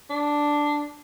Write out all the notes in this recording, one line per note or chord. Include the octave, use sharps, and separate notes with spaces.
D4